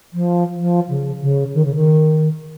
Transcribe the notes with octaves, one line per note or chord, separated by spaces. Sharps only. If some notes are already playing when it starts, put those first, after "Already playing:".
F3
F3
C#3
C#3
D#3
C#3
D#3